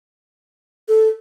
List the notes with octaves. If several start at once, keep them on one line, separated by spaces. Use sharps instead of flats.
A4